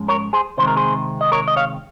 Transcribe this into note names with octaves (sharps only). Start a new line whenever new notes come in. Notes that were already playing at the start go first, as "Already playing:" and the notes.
Already playing: G#2 F3 G#3 C#4
A#4 C#5
G#4 C5
C3 D#3 G#3 C4 C5
A#4
G#4 C5
D#5
A#4 C#5
D#5
C#5 F5